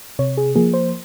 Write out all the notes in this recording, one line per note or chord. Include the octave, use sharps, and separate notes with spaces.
C3 C#5
G#4
F3 A#3 G#4
C5